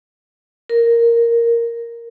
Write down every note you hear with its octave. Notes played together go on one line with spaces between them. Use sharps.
A#4